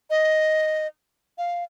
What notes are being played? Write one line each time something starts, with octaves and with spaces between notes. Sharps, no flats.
D#5
F5